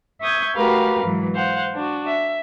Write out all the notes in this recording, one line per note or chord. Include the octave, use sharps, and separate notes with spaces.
E5 C#6 D#6 G6 G#6
A3 F#4 G4 A#4 B4 F5
G#2 E3 F#3
C5 F5 F#5
D4 F#4
E5